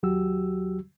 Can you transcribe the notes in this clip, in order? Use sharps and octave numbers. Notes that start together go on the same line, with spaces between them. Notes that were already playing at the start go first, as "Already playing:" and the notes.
D#2 F#3 F#4 G4 E6